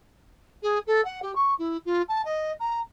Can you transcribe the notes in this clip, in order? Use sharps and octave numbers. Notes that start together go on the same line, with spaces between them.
G#4
A4
F#5
G4
C#6
E4
F4
A5
D#5
A#5